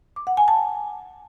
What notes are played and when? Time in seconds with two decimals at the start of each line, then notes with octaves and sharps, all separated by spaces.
0.16 D6
0.27 F#5
0.37 G#5
0.48 A5